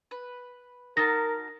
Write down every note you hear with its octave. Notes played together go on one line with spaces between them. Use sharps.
B4
D#4 F#4 A#4 A5 A#6